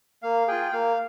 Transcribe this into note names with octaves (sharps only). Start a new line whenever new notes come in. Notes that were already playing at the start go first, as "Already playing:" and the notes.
A#3 F5
F4 G#4 G5
A#3 F5